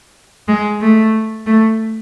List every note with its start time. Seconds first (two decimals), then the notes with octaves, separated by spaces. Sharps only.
0.48 G#3
0.81 A3
1.46 A3